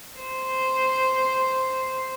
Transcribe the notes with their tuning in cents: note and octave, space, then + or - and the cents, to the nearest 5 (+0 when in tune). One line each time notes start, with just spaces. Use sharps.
C5 -5